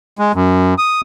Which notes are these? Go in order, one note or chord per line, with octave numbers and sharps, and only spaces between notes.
G#3
F#2
D#6